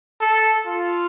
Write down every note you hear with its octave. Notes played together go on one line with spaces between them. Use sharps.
A4
F4